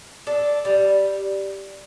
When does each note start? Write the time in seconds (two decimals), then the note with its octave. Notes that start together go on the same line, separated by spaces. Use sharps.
0.27 D4 A4
0.65 G3